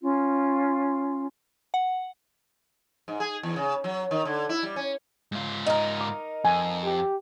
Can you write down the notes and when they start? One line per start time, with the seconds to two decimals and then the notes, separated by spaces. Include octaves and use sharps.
0.01 C#4 F4
1.74 F#5
3.08 G#2
3.20 G#4
3.43 E2
3.56 C#3
3.84 F#3
4.11 D#3
4.25 D3
4.49 E4
4.63 G3
4.76 C#4
5.32 G#2 F4
5.66 D#4 A#4
6.01 D6
6.45 F2 G#5
6.84 G4